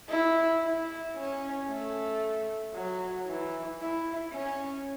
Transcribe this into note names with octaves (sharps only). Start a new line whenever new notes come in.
E4
E4
C#4
A3
F#3
E3
E4
C#4